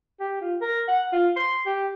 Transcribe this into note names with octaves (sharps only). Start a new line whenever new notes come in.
G4
F4
A#4
F#5
F4
C6
G4